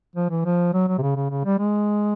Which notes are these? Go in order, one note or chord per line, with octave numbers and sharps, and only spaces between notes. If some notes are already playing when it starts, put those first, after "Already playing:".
F3
E3
F3
F#3
F#3
C3
C#3
C#3
C#3
G3
G#3